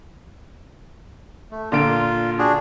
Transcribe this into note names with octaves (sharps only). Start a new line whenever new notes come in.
A3
A#2 D3 F4 D7
D4 F#4 G#4